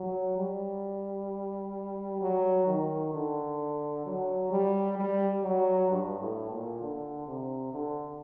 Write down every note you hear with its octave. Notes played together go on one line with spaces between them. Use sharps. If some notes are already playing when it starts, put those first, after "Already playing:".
Already playing: F#3
G3
F#3
D#3
D3
F#3
G3
G3
F#3
G2
A2
A#2
D3
C3
D3